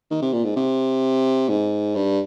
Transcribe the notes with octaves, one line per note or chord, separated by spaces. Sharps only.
D#3
C3
A#2
G#2
C3
G#2
G2